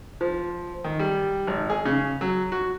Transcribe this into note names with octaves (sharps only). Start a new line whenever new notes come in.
F3
D#3
G3
G#1
G#4
C#3
F#3
F#4